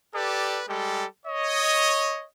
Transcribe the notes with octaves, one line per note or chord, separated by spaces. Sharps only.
G4 A4 B4 D5
G3 G#3 G4 A4
C#5 D#5